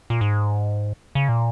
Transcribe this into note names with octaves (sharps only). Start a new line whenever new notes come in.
A#2
G#2
C#3
A#2